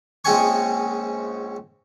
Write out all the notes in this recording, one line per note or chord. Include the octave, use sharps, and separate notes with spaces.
A#1 G#3 C4 C#4 G#5 C#6